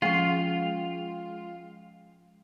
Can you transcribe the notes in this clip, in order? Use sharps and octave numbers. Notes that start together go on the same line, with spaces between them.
F3 G#3 C#4 F4 F#5 G5 C7